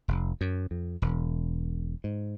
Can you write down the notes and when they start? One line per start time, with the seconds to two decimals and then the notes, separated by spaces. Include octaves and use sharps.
0.08 F1
0.41 F#2
0.71 F2
1.02 E1
2.04 G#2